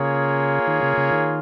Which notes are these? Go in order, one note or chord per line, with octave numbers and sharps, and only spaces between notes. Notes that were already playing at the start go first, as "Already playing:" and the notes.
Already playing: C#3 A#3 F4 G#4 C#5
D#3
C#3
C#3
D#3